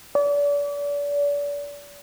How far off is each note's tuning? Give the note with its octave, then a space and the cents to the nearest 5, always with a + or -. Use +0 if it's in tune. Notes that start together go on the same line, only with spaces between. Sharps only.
D5 -35